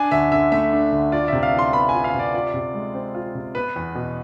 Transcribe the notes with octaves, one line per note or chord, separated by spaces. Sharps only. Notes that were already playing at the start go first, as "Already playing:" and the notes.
Already playing: D4 G#5
D2 E5
D3 E5
A3 E5
D4
D2
F4 D5
C3 E5
F5
E3
C6
B3 B5
F4 G#5
F5
C3 D5
F4 D5
C3
G#3
C4
F4
C3
B3 B4
E2
B2